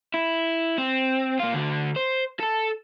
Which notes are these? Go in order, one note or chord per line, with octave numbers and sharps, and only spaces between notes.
E4
C4
A#3 F4
D2 D3
C5
A4 A5